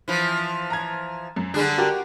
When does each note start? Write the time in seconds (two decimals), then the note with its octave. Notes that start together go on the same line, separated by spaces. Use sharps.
0.08 E3 F3
0.70 A#5 G#6
1.36 F#2
1.54 D3 G3 D4 G#4
1.78 F#4 G4 A#4